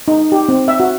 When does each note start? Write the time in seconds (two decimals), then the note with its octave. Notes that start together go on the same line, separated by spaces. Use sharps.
0.08 D#4
0.32 G4
0.49 C4
0.68 E5
0.80 F#4